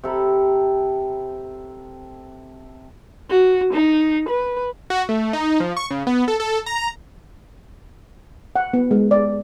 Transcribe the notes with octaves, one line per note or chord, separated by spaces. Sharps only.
C3 A4 A#5 B5
F#4
D#4
B4
F#4
A3
D#4
F3
C#6
C#3
B3
A4
A4
A#5
F#5
B3
G#3
D5